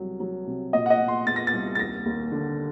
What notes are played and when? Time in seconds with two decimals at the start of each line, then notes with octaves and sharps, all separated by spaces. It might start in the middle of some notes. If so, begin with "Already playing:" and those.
Already playing: C2 F#3
0.20 F#3
0.47 C3
0.73 A#2 D#5
0.86 F#5
0.90 D#5
1.00 A#2
1.08 C6
1.27 A#2 A6
1.36 A#6
1.47 A6
1.53 C2
1.75 A6
1.79 D#2 A#6
2.05 D#2
2.32 D3